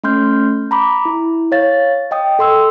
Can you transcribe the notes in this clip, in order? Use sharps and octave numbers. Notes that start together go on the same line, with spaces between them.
A3 C#4 C6 F6 G6
A#5 B5 D6
E4
C#5 F5 A6
D#5 G5 D#6
A4 C6 E6